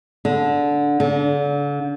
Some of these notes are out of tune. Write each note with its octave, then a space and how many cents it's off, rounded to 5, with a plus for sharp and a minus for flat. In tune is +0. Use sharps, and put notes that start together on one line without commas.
D3 -10
D3 -35